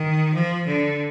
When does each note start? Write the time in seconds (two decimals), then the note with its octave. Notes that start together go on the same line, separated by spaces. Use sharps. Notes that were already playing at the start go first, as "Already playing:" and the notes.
Already playing: D#3
0.34 F3
0.67 D3